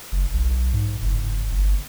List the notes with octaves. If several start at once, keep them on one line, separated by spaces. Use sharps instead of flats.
F#1
B1
G#2
F#1
G1